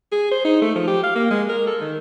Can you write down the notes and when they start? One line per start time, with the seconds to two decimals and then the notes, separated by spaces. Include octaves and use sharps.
0.12 G#4
0.31 C5
0.45 D#4
0.62 A3
0.75 F3
0.88 G4
1.03 F5
1.15 A#3
1.31 G#3
1.49 A#4
1.67 A4
1.81 D#3